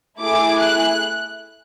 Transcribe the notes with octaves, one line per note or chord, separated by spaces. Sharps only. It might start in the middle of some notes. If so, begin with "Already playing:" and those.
A3 E4 G#4 D6
F#6